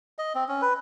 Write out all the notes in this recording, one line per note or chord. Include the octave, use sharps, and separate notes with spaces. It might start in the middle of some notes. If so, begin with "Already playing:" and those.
D#5
C4
C#4
B4